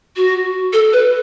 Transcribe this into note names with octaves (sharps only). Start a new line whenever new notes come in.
F#4
A4
B4